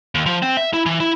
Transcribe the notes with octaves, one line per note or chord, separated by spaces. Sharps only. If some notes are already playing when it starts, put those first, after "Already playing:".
D#2
F3
C4
E5
E4
E3
E4